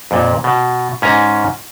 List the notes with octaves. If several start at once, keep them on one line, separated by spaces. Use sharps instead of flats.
F2 A#2
B2
G#2 C#4 G#5 A#5